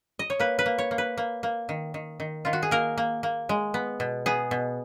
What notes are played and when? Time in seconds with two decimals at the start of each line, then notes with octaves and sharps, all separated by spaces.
0.19 D#5
0.30 C#5
0.39 A#3 B4
0.59 B4
0.66 A#3
0.78 C#5
0.91 A#3
0.98 B4
1.18 A#3
1.43 A#3
1.69 D#3
1.94 D#3
2.20 D#3
2.45 D#3 F4
2.53 F#4
2.63 G#4
2.71 A#3 A#4
2.98 A#3
3.23 A#3
3.49 G#3
3.74 B3
4.00 B2
4.26 B3 G#4
4.51 B2